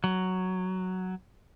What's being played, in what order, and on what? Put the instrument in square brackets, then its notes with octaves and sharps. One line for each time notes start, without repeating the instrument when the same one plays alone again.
[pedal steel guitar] F#3